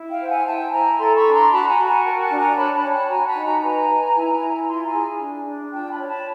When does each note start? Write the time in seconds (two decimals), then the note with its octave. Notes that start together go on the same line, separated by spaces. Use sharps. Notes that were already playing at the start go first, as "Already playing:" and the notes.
Already playing: E4
0.10 F5 G5
0.20 C5
0.28 F#5 G#5
0.46 E4 G5 A5
0.71 E4 G#5 A#5
0.98 A4 A#5 C6
1.15 B5 C#6
1.25 D4
1.33 A#5 C6
1.51 F#4 A5 B5
1.68 G#5 A#5
1.78 F#4
1.86 G#5 A#5
2.04 A#4 G5 A5
2.21 G5 A5
2.30 D4
2.39 G#5 A#5
2.56 C#5 A5 B5
2.74 A5 B5
2.83 C#5
2.91 G5 A5
3.09 F#4 G#5 A#5
3.26 A5 B5
3.35 D#4
3.44 G#5 A#5
3.61 B4 G#5 A#5
3.88 B4
4.15 E4
4.41 E4
4.67 F4 A#5 C6
4.84 G#5 A#5
4.93 G#4
5.20 D4
5.46 D4
5.73 F4 G5 A5
5.90 A5 B5
5.99 C#5
6.08 A5 B5